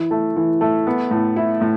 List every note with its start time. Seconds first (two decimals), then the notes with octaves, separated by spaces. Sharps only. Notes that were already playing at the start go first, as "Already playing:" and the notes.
Already playing: E3
0.11 A3
0.37 E3
0.61 A3
0.87 B3
1.11 A2
1.36 E4
1.61 A2